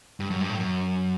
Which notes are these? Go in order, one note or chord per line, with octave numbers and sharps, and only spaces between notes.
G2
F#2
G2
A2
F#2